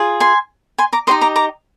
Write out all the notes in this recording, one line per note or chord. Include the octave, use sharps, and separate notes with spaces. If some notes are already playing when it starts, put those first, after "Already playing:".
Already playing: F4 G#4
G#5 C6
G#5 C6
A#5 D6
D#4 G4 C5 D#5 C6 D#6
A#5 D6
A#5 D6